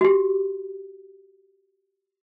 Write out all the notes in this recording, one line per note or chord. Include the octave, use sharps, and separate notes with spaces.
F#4 G4